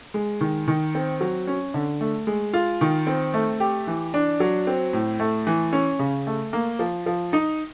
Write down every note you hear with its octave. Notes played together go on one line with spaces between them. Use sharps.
G#3
D#3
D#3
C4
F#3
C#4
D3
A3
G#3
F4
D#3
C4
A3
G4
E3
D4
F#3
C4
A2
A3
E3
C#4
C#3
A3
A#3
F3
F3
D#4